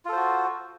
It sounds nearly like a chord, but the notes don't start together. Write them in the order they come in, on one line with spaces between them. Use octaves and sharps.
F4 A4 C5 F#4